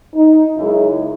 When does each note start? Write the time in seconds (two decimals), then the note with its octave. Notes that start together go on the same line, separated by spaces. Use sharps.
0.14 D#4
0.56 F#2 C#3 G#3 D#4 E4